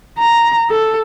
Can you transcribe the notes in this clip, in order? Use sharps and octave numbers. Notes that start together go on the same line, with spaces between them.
A#5
A4